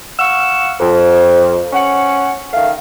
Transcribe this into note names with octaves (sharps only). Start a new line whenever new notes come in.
F5 F#5 C#6 E6
F2
C#4 F#5
D#3 A3 F5